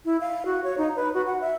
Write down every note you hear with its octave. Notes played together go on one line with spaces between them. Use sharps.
E4
F5
F#4
C#5
D#4
B4
F#4
F#5
E5